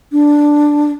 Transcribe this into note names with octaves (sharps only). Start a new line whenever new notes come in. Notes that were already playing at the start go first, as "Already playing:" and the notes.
D4